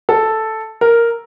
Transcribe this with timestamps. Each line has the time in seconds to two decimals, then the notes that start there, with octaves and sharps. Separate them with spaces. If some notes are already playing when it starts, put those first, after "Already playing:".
0.09 A4
0.81 A#4